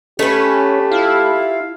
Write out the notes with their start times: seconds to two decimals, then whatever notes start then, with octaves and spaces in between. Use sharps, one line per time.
0.19 A3 C#4 G4 B4
0.92 E4 F4 F5